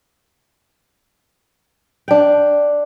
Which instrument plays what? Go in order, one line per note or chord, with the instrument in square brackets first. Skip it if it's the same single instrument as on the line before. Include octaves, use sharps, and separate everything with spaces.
[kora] D4 G5